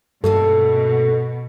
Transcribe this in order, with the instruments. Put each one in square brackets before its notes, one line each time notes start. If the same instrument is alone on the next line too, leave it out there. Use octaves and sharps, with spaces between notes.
[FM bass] G2 [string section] B2 [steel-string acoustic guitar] A3 A#3 C#4 [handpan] A4